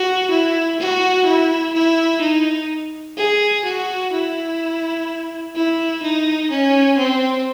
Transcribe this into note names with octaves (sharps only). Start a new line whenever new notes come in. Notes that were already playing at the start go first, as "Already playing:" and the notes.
Already playing: F#4
E4
F#4
E4
E4
D#4
G#4
F#4
E4
E4
D#4
C#4
C4